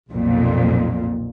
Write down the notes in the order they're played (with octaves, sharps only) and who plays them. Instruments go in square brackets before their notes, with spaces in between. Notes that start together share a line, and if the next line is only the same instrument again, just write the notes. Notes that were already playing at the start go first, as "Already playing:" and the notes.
[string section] B1 F2 A#2